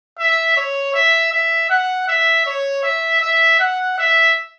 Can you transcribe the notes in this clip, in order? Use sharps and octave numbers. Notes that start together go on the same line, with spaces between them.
E5
C#5
E5
E5
F#5
E5
C#5
E5
E5
F#5
E5